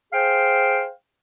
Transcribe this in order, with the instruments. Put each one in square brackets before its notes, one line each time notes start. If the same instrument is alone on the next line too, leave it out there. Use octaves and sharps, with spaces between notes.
[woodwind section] G#4 C5 F5 G5